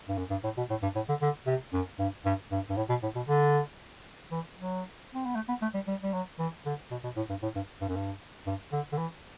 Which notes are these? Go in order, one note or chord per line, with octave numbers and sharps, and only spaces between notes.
G2
F#2
G2
A2
B2
A2
G2
A2
D3
D3
C3
F#2
G2
G2
G2
G2
A2
B2
A2
B2
D3
E3
F#3
C4
B3
A3
B3
A3
G3
G3
G3
F#3
E3
D3
B2
B2
A2
G2
A2
G2
G2
F#2
G2
G2
D3
D3
E3